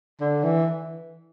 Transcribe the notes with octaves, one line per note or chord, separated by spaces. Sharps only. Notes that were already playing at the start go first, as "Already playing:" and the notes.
D3
E3